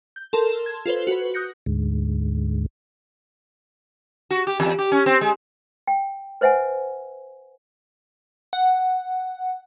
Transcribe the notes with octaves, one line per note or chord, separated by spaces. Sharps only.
G6
A4 A#4 A5 C6 E7
G#6
F4 A4 B4 C5
F#4 B4
D#6 F#6 G6 A#6 C#7
D2 G#2
F#4
G4
E2
G4
C#4
C4
G#3
G5
B4 C5 E5 F#5 G#5
F#5